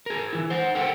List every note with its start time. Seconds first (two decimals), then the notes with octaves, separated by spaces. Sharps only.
0.06 G#4 A#4
0.33 E3 E4
0.50 C5 F#5
0.75 A4 A#4 F#5 G5